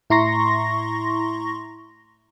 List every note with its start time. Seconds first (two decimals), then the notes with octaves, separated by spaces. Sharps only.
0.10 A2 E4 A#5 C6 C#6 A#6